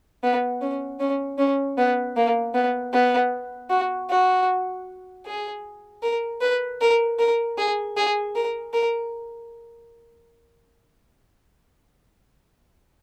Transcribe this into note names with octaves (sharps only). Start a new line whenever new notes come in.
B3
C#4
C#4
C#4
B3
A#3
B3
B3
F#4
F#4
G#4
A#4
B4
A#4
A#4
G#4
G#4
A#4
A#4